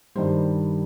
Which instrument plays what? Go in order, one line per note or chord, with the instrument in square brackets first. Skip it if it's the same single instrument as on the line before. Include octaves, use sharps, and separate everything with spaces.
[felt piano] G2 D#3 G3 C5